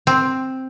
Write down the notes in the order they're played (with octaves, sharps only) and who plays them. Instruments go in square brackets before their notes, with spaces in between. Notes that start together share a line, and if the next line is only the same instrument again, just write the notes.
[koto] C4